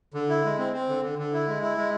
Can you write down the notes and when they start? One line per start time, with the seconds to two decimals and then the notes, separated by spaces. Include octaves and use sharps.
0.14 D3
0.29 E4
0.44 G#3
0.58 C4
0.73 C4
0.89 D3
1.03 D3
1.18 D3
1.33 E4
1.47 G#3
1.62 E4
1.77 G#3